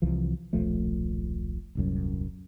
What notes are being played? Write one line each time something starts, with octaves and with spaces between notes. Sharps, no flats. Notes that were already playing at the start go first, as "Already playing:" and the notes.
C2 E3 F3
D#1 B1 F3 A3
D#1 C2 F#2